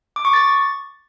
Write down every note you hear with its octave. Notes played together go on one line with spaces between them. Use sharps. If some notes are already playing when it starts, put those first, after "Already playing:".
D6
C#6
A6